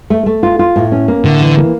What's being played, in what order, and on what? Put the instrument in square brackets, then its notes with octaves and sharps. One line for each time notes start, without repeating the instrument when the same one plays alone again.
[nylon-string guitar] A3
A3
F4
F4
A2
C#4
A#3
[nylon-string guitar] A2 [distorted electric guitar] D3
[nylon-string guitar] E3
A#3